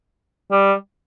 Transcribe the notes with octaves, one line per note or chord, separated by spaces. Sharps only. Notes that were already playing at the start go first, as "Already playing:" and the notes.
G3